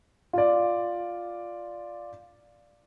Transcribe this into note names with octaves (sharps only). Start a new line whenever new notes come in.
F4 D5